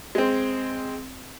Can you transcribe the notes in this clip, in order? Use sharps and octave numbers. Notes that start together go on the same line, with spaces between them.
G#3 C4